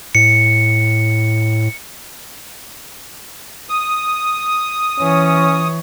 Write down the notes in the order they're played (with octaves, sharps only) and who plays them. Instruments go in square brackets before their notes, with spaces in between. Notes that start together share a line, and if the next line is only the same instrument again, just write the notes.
[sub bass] A2 [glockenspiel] C#7
[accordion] D#6
[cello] E3 C#5 [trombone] C#4